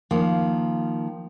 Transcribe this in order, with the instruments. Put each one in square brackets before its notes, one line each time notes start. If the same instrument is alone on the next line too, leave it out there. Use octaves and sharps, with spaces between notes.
[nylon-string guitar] D#3 F3 A#3